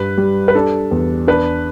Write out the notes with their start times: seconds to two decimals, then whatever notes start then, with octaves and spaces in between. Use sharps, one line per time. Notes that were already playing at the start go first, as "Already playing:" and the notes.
Already playing: G2 B4
0.18 G3
0.48 B4
0.55 D4 A4
0.91 E2
1.27 D4 B4